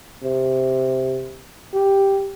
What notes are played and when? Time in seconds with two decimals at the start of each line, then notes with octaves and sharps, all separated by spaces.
0.23 C3
1.74 G4